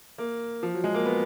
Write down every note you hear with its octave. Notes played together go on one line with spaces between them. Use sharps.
A#3
F3
F#3
G#3
A#3
B3